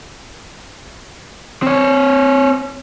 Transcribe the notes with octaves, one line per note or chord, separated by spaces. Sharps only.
C4 C#5